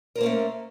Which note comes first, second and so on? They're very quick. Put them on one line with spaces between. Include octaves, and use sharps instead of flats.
A#4 C5 A#3 C#4 A3